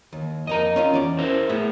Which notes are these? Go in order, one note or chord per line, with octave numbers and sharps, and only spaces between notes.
D#2
F2 A#3 A#4 D#5 A#5
C#4 F4 F5
E2 C#4 D5
E4 A#4 C5
A2 B3 G#4 E5